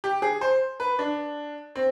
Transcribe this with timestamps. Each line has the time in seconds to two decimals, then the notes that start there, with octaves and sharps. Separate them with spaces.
0.04 G4
0.22 G#4
0.41 C5
0.80 B4
0.99 D4
1.76 C4